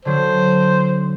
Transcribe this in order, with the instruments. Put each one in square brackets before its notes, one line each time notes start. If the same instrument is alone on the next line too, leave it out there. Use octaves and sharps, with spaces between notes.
[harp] D3 F#3 [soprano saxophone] C5